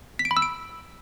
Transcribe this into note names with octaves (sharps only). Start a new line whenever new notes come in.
B6
D7
B5
E6
D7